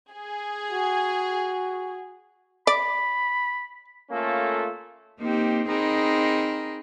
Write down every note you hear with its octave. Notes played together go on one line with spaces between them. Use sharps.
G#4
F#4
D5 B5
A3 A#3 C#4 F4 A4
A#3 C4 D#4 G4
C4 D#4 G#4 A#4 D#5 B5